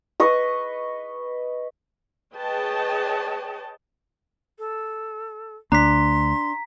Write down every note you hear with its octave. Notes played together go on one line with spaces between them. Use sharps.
B4 D#5 C#6
G#4 B4 C#5 D#5 G5 A5
A4
D2 D4 A#5 C6 B6